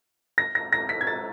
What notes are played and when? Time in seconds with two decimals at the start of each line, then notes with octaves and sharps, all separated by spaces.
0.38 A#6
0.55 A#6
0.73 A#6
0.89 B6
1.01 G#6
1.07 A6